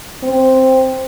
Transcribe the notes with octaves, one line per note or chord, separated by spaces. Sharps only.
C4